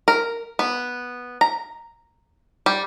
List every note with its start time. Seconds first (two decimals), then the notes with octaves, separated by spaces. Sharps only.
0.08 A#4
0.59 B3
1.41 A#5
2.66 G3